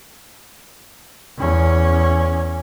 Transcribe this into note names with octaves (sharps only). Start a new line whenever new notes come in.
E2 C#4